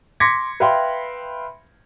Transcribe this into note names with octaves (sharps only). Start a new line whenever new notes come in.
C6 D6 G#6 A#6 B6 C#7
B4 E5 F5 G5 B5 C6